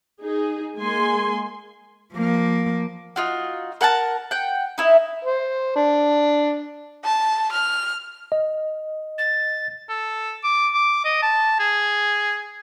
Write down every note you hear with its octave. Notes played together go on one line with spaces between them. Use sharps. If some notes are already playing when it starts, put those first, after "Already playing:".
D#4 G#4
G#3 A#3 G#5 C6
F3 A#3
D#4 F4 F#4
A#4 F#5 G#5 A5
F#5 G5
D#4 E4 E5
C5
D4
A5
F6
D#5
A6
A4
D6
D6
D#5
A5
G#4